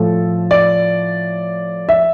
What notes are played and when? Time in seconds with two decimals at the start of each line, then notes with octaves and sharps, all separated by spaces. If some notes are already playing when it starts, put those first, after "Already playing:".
Already playing: A2 F3 A4
0.51 D5
1.89 E5